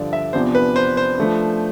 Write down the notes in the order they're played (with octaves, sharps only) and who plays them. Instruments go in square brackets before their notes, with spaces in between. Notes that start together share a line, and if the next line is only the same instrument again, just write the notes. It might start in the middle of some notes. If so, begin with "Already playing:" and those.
Already playing: [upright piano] G2 D3 F3 [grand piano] D5
[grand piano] E5
[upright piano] E2 C3 F3 B3 D4 [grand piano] C5
[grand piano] B4
C5
C5
[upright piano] F3 A3 D4